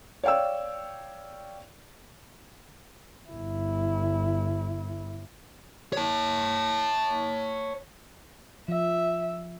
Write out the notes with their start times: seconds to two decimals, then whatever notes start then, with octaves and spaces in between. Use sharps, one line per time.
0.24 C#5 D5 F5 G5 E6
3.30 G1 E4
5.93 C#5 A5
8.68 F3 E5